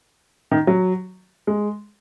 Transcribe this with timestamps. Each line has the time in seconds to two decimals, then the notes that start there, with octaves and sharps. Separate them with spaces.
0.51 D#3
0.67 F#3
1.47 G#3